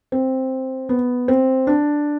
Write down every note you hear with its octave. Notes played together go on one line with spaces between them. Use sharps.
C4
B3
C4
D4